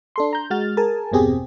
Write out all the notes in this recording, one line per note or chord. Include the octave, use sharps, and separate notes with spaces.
D4 A4 C6
A#5 G6
G#3 F#4 F6 A6
G#4 A#4 G#5 A5
G1 E2 B2 C4 G4 G#4